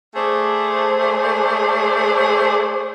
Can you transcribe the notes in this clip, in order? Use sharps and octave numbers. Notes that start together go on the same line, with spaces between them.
A3 G#4 C5 D5